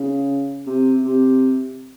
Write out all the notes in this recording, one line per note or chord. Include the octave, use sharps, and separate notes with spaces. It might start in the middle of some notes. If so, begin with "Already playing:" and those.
Already playing: C#3
C3
C3